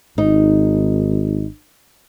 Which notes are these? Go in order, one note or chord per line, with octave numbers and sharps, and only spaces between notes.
G#1 D#4